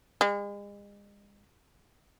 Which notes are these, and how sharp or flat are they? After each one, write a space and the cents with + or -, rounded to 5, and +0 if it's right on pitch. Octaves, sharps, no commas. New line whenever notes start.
G#3 -40